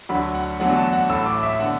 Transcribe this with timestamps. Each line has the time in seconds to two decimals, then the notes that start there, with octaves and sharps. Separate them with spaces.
0.09 D2 D3 F#3 B5
0.35 F#5
0.60 E2 D3 F#3 A3 F#5
0.76 A5
0.93 F#5
1.09 A1 A2 A3 E6
1.26 D6
1.43 E5
1.60 D3 B3 F#5